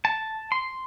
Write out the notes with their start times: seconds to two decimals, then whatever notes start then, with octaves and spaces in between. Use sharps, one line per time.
0.05 A5
0.52 C6